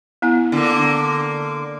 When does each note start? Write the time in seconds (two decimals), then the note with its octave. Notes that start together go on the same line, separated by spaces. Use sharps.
0.22 B3 E4 G#5
0.52 D3 A#3